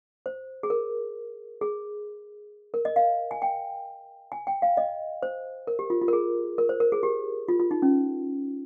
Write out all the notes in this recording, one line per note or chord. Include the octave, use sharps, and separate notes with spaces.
C5
G#4
A#4
G#4
A#4
D#5
F5
G#5
G5
G#5
G5
F5
D#5
C5
A#4
G4
F4
F4
A#4
G#4
A#4
C5
A#4
G#4
G4
F4
F4
D#4
C#4